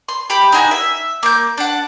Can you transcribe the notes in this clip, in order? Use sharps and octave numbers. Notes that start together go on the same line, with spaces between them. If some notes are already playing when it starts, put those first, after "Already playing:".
C6
G4 B5
D#4 E4 F#4 G#5
E5
A#3 G6
D4 F#5